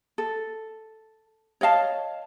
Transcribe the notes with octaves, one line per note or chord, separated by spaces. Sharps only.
A4
C#5 D#5 F5 A5